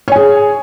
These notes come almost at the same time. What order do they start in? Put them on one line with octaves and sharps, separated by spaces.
C#5 G#5 G#4